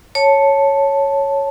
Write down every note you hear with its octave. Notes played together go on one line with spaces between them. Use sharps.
C#5 A5